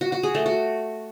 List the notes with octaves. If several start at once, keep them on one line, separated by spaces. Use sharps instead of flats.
F#4
F#4
G#4
A3
F#4